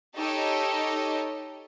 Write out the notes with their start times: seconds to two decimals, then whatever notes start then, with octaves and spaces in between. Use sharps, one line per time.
0.16 D#4 G4 A4 C#5 D#5